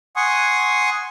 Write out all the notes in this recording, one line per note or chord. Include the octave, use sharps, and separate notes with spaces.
F#5 G#5 C6 C#6 D#6